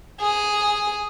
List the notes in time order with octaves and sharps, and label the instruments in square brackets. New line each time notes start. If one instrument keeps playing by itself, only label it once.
[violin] G#4